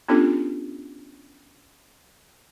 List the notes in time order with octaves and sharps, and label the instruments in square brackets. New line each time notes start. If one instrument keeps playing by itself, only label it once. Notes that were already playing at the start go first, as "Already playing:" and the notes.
[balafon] B3 C#4 D4 F4 G4 A4